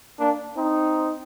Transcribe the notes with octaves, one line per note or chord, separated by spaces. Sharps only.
A#3 D4
C4 D#4